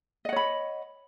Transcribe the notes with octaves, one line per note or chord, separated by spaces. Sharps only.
C#5 D#5 F#5 B5